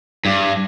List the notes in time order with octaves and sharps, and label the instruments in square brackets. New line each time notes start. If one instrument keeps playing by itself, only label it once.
[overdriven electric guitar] G2